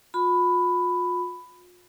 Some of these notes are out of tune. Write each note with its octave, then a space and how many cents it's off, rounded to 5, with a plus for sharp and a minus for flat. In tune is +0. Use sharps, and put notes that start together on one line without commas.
F4 +40 B5 +10